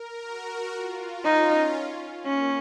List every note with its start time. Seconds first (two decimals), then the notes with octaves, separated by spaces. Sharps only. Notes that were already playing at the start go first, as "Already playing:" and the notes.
Already playing: A#4
0.22 F#4
0.73 F4
1.24 C#4 D#4
2.26 A#3 C#4